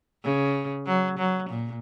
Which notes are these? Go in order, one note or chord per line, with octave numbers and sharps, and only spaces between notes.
C#3
F#3
F#3
A#2